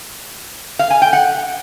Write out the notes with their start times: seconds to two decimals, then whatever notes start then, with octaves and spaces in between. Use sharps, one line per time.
0.79 F5
0.91 G#5
1.02 G5
1.13 F#5